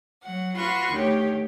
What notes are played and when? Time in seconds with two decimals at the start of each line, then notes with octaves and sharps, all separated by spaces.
0.22 F#3 F#5
0.55 F4 F#4 B4 C6 C#6
0.92 D2 D#3 G4 C#5